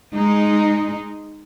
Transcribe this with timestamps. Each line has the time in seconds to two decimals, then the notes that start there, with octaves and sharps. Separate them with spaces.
0.14 G#3 D#4